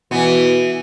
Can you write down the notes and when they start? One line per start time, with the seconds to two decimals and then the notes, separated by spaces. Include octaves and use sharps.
0.11 B2 E3 B3